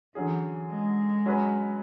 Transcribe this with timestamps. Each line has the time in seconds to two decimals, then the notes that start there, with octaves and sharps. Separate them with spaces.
0.15 D3 E3 F#3 C#4 G#4
0.70 G#3
1.26 F#3 C#4 G#4 B4